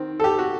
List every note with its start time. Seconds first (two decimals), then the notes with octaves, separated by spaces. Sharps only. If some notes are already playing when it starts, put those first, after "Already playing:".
Already playing: D#3 C4
0.20 A4
0.24 G4
0.39 F#4